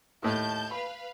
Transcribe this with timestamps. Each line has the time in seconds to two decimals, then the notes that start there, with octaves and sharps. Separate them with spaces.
0.22 D#2 A2 A5 G6
0.71 B4 F5 B5